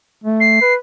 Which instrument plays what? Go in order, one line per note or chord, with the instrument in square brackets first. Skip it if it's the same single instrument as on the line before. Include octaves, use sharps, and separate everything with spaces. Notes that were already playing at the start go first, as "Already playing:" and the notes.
[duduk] A3
[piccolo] C7
[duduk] B4